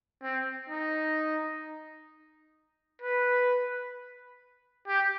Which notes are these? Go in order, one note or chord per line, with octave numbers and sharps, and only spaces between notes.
C4
D#4
B4
G4